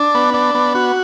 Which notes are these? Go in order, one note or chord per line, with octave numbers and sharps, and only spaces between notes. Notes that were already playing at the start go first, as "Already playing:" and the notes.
Already playing: D4
B3
D4
B3
F#4